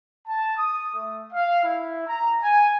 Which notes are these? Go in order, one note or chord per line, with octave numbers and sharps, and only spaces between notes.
A5
D#6
A3
F5
E4
A#5
G#5